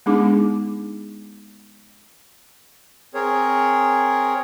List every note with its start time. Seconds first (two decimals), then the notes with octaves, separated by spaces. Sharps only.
0.06 G#3 B3 D4 D#4 G#4 D6
3.14 C4 G#4 A#4 C#5